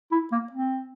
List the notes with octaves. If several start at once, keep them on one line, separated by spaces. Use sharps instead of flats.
E4
A#3
C4